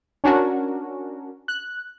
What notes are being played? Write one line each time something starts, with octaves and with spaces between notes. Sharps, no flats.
C#4 D4 F#4 A#4
F#6